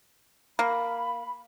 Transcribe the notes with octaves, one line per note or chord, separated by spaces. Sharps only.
A#3 B5